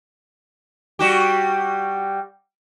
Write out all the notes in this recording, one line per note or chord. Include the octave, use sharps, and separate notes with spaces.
G3 F#4 G4